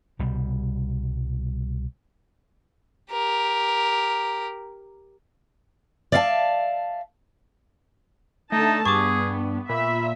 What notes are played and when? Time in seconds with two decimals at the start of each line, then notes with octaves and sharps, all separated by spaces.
0.19 C2 B2 G3
3.12 G4 A#4
6.12 D5 E5 F5 G5 A5
8.52 D3 A3 D#4 A5
8.86 G2 B3 G#4 C#6 D6
9.69 A#2 E5 B5